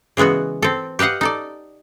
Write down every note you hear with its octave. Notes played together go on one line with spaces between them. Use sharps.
C#3 E3 G#3 B3 F#4
C4 A4
G4 B4 D#5 F5 F#5
D#4 A4 D5